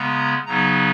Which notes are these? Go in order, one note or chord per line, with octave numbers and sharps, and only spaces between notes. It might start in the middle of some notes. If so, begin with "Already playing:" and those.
Already playing: C#3 G#3 B3 A#5
C#3 F#3 B3 D#4 A#5